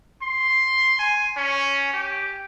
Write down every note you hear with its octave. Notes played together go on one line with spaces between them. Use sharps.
C6
G#5
C#4
G4